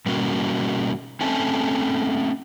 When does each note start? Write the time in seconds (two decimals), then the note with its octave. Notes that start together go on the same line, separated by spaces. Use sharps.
0.06 B2 G3 A#3 C#4 F#4
1.21 A3 C4 C#4 G#5 A5